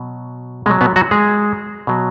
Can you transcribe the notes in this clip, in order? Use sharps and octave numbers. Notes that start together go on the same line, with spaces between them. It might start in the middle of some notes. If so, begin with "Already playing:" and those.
Already playing: B2 F#3
B2 F#3 G#3
B2 B3
F#3 F#4
G#3 G#4
B2 F#3